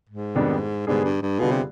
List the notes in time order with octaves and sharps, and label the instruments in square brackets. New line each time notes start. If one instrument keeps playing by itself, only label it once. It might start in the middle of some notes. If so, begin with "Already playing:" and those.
[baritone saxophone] G#2
[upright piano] F2 D#3 G3 B3 D4
[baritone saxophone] G#2 [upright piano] D3 G3 B3 D4 G#4
[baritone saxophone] G2
G2
[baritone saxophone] B2 [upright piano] D3 G3 B3 F4 G#4
[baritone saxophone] C3